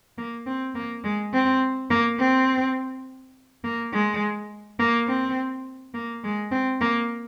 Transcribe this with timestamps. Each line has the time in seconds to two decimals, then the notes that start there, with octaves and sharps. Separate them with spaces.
0.18 A#3
0.47 C4
0.75 A#3
1.04 G#3
1.34 C4
1.90 A#3
2.19 C4
3.64 A#3
3.93 G#3
4.79 A#3
5.08 C4
5.94 A#3
6.24 G#3
6.51 C4
6.81 A#3